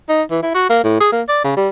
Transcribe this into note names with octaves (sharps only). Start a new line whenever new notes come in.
D#4
E3
E4
F#4
A#3
A2
G#4
A#3
D5
C#3
G3